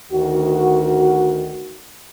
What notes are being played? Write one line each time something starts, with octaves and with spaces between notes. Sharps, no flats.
D2 D#3 F#4